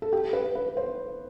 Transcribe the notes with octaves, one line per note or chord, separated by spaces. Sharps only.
A4
G4
B4
B4
C5